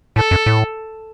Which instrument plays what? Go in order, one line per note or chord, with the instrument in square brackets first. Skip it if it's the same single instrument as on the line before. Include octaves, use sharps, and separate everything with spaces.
[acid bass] A2 [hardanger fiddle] A4
[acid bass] F#2
A2